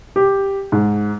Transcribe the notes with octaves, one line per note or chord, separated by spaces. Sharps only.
G4
G#2